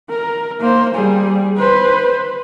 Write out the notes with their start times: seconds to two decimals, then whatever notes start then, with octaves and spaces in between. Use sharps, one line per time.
0.10 A#4
0.61 A#3 C5
0.95 G3 G#4
1.58 B4 C5